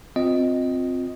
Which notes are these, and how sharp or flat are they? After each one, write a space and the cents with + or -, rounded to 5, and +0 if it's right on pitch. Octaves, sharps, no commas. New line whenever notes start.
C4 -5 F4 +25 D#5 +0